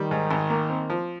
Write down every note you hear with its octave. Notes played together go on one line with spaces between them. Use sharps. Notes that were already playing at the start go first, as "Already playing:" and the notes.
Already playing: D#3 G3
G#2
G#1
A#3
C4
F3